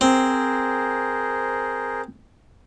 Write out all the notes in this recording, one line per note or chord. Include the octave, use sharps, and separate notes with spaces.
C4 G#4 A#4 C5